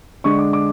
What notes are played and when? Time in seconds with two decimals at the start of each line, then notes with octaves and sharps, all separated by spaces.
0.24 D3 G#3 D4 C#6
0.39 D6
0.53 D6